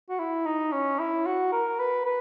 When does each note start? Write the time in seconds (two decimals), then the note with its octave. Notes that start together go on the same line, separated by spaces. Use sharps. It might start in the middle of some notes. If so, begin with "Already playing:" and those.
0.09 F#4
0.19 E4
0.46 D#4
0.72 C#4
0.99 E4
1.26 F#4
1.52 A#4
1.79 B4
2.05 B4